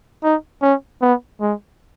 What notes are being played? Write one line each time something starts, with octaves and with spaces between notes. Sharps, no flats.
D#4
C#4
B3
G#3